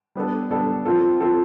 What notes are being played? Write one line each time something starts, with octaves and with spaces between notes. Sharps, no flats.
G3 B3 D4 A4
G3 B3 D4 A4
F3 C4 F4 A4
F3 C4 F4 A4